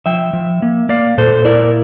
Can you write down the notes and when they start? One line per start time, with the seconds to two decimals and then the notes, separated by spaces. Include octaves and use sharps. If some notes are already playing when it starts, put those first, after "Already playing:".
0.06 F3 E5 G5
0.33 F3
0.62 A#3
0.89 A#3 D5 F5
1.18 A#2 A4 C5
1.45 E4 A#4 D5